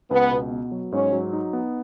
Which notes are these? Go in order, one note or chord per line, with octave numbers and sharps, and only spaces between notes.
C#2 B3
B2
B3
F#3
G#2 C#4
F#3
D#4
B3